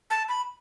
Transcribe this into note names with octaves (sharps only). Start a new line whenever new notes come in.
A5
B5